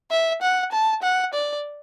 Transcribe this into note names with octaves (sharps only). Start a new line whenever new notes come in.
E5
F#5
A5
F#5
D5